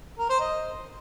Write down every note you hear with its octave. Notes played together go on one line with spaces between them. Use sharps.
A#4
C5
D#5